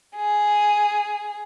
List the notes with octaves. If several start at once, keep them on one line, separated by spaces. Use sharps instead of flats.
G#4